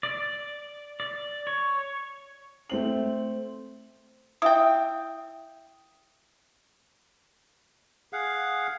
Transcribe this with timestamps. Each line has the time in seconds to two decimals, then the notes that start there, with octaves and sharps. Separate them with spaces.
0.03 D5
1.00 D5
1.47 C#5
2.70 A3 C4 F#7
4.42 E4 E5 G5 D#6
8.13 G#4 F5 F#5